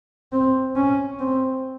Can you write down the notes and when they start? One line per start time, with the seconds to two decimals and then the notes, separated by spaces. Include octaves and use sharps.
0.32 C4
0.76 C#4
1.20 C4